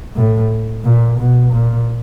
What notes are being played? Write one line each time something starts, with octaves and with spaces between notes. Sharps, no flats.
A2
A#2
B2
A#2